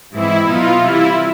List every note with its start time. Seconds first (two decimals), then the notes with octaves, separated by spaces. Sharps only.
0.12 G#2 E3 G#3 C4 E4
0.47 B2 F#3 B3 D#4 F4
0.82 C3 E3 G3 E4